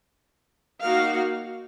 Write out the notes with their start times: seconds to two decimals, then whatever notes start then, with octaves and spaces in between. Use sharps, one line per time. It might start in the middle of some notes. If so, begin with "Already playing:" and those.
0.84 A#3 D#4 F#4 A#4 F5